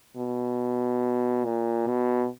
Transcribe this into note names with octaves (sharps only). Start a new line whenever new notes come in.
B2
A#2
B2